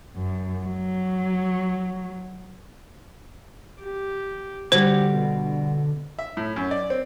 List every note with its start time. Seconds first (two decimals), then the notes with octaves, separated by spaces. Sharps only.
0.16 F#2
0.65 F#3
3.82 G4
4.72 D3 G3 F#4 G4 C5
5.14 B2
6.19 E5
6.37 A2
6.56 F#2
6.71 D5
6.90 C4